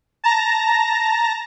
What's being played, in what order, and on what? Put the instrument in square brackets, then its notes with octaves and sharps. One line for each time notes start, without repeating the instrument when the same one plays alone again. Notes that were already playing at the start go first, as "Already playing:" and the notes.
[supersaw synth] A5 A#5 A#6